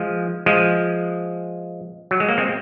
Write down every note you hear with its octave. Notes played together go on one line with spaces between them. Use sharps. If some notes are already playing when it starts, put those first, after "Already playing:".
Already playing: F3 G#3
F3 G#3
F#3
G#3
A#3
G#3 C4